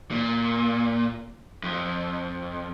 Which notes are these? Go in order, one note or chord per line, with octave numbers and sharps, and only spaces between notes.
A#2
F2